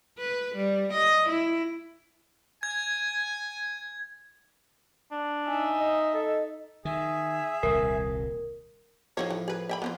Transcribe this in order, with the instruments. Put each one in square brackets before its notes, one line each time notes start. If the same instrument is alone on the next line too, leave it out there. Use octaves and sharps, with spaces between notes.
[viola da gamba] B4
G3
D#5
E4
[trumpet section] G#5 [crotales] G#6
[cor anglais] D4
[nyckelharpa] D#4 E5 [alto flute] G#5
[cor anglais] D#5
[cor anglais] A4 [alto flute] D#5
[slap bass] D#3 [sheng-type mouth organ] G#4 [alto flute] E5
[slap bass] D#1 C2 A#2 [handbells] A#4
[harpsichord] A2 F3 [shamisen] D#4 F#4 C#5
[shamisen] E3
G#4 B4
E5 G5 B5
[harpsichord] F2 [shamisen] B3 D4 F4